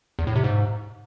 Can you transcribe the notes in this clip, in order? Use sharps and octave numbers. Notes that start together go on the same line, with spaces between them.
E2
A2
C3
G#2